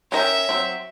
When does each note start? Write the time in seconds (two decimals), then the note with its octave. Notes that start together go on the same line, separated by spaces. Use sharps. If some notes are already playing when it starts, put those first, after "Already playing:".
0.12 C#4 A#4 E5 G5
0.49 F#3 C4